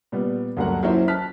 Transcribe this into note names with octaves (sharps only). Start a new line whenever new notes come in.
A#2 G3 B3
D2 G2 F#3 A#3 A#4 F#5
F#3 A#3 C#4 E4 F4 C5
A5 F6 F#6 B6